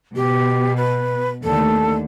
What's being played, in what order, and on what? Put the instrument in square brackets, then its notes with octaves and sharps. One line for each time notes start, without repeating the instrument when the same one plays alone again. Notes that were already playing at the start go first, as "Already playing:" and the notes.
[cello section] B2 [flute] G4
[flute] B4
[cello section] D#2 D3 A3 [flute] A4